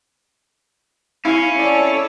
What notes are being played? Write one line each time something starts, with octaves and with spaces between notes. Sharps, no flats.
C#4 E4 F5
A4 C#5 D5